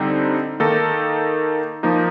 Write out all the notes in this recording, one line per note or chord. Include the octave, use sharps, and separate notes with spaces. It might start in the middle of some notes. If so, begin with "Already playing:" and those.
Already playing: D3 G3 C4 D#4
D#3 A#3 D#4 A4
F3 A#3 D#4